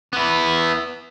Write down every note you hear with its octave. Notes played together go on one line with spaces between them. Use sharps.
B3 E4